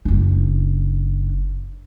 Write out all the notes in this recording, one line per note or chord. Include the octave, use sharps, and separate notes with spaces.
F#1 D4